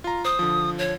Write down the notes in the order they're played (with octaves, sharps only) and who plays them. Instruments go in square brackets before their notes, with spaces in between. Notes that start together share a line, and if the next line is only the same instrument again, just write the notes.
[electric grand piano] F4 A#5
[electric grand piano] C5 [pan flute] D#6
[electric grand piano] D3 F3
[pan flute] C#5